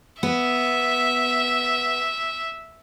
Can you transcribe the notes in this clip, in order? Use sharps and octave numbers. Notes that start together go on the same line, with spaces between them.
B3 E5